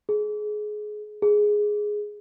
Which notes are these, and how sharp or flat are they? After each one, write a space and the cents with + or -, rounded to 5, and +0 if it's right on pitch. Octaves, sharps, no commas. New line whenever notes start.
G#4 +25
G#4 +5